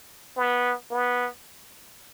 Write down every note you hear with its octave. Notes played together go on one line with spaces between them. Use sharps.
B3
B3